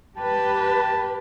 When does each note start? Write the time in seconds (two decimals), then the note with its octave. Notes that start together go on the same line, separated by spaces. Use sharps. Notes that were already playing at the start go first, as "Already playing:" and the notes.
0.17 G4 B4 A5